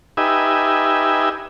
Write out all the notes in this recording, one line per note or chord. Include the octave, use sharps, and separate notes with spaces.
D#4 G4 B4 E5 G#5